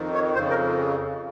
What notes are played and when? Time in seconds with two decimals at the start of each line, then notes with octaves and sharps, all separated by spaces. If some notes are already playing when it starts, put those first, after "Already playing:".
Already playing: F2 D#3
0.14 C#5
0.34 F2 C#3 C5
0.50 A#4